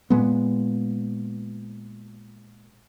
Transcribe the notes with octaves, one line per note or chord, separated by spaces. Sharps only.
A#2 G#3 B3